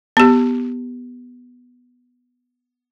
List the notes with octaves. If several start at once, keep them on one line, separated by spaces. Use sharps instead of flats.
B3 G4